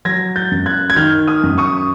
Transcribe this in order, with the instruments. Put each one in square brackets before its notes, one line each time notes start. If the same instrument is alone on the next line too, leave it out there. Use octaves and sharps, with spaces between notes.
[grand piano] F#3 G#6 A#6
G6 A6
F#2
F#6 G#6
G#6
D#3 F6 G6
D#6 F6
F#2
C#6 D#6